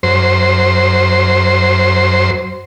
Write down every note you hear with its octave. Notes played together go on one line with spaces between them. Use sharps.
F#2 C5